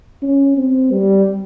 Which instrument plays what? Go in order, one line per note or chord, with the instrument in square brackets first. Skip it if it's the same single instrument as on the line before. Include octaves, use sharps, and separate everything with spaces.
[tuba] C#4
C4
G3